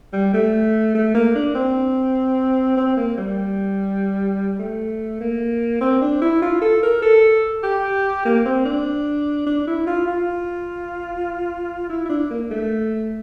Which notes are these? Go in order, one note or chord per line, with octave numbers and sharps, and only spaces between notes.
G3
A3
A3
A#3
D4
C4
C4
A#3
G3
A3
A#3
C4
D4
E4
F4
A4
A#4
A4
G4
A#3
C4
D4
D4
E4
F4
F4
E4
E4
D4
A#3
A3